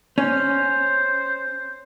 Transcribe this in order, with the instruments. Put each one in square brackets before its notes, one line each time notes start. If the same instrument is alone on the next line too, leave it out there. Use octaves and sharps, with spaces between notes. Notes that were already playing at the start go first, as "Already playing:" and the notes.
[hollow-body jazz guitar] C#4 [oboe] C5